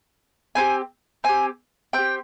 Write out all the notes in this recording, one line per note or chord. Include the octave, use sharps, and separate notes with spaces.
C4 E4 G4 G#5
C4 G4 G#5
C4 G4 G5